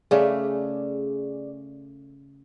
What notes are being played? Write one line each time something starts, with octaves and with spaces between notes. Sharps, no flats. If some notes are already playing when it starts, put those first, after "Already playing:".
C#3 A3 G#4 D5